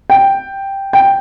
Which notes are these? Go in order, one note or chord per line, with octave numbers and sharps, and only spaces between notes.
G5
G5